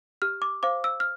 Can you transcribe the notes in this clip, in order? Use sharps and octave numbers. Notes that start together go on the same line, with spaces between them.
G4 F6
D6
C5 F5 D6
E6
F6